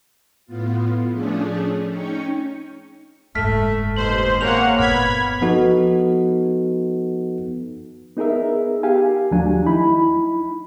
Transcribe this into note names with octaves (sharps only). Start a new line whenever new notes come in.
A2 B3 F4
F3 A3 C#4 D4 G#4
C#4 D#4 G5 C#6
F#1 G#2 A3 F6 B6
D#2 B2 C5 F#7
A#3 C4 G#4 C#5 F#5 F7
G1 A#2 B3 B5 F6 G#6 B6
F3 B3 D#4 F#4 A4
B3 D#4 G#4 A#4 E5
G4 F5 G#5
D#2 F3 F#3 A3 D4 G#5
D#4 E4 B5